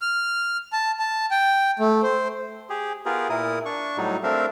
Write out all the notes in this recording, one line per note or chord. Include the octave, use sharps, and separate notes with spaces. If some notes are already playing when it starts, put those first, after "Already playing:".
F6
A5
A5
G5
A3
C5
G4 G#4
B3 F4 G4 G#4 A#4
A#2 E4 A#4 D#6
D4 C#6
A2 F#3 G3 D#4
A3 C4 D4 A#4 E5 F5